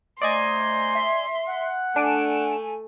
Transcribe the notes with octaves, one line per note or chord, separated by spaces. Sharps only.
A3 C5 D5 D#5 G#5 A#5 C6
E5
F#5
A3 D4 G#5 D7 E7